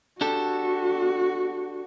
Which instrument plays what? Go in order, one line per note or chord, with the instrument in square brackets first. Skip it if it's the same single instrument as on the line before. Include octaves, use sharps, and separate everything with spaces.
[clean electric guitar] D4 G4 A4 [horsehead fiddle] F#4